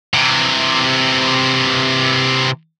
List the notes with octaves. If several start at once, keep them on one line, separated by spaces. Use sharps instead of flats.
C3 E3